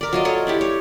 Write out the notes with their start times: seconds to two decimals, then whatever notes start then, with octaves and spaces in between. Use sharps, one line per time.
0.01 A#4 D5
0.13 F#3 F4 D#5
0.25 A4 C#5 D#5
0.47 D4 E4 G4
0.61 C#5